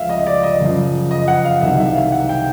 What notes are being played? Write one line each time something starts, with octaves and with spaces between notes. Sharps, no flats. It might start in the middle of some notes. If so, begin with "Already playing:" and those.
Already playing: C#2 C#3 F3 E5 F5
D#5
D5
D#5
F#2 C#3 F3
D#5
F#5
F5
C2 C3 D#3 F#3 E5
E5
F5
F#5
G5